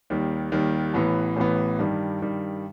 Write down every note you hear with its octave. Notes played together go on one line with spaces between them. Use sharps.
D#2 D#3 G3
D#2 D#3 G3
A1 A2 E3 B3
A1 A2 E3 B3
G2 D#3 G3
G2 D#3 G3